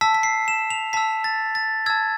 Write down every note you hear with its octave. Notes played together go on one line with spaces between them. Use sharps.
A5 E6 B6
B6
C7
E7
F7
A5 E6 B6
A6
A6
A5 E6 G#6